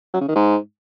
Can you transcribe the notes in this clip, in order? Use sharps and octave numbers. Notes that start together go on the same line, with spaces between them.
F#3
C#3
D#3
G#2